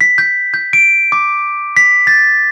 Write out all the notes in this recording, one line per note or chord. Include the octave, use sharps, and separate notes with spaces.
B6
G6
G6
D7
D6
B6
A6